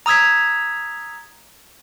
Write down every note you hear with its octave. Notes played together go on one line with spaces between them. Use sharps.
A#5 D#6 E6 G#6 B6